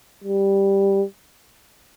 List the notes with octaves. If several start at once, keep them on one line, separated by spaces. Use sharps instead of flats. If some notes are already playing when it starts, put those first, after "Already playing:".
G3